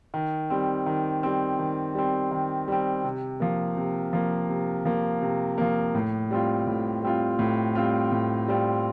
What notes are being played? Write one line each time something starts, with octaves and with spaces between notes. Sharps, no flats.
D#3
G3 C4
D#3
G3 C4
D#3
G3 C4
D#3
G3 C4
C3
F3 A#3
C3
F3 A#3
C3
F3 A#3
C3
F3 A#3
A2
G3 C4 F4
A2
G3 C4 F4
A2
G3 C4 F4
A2
G3 C4 F4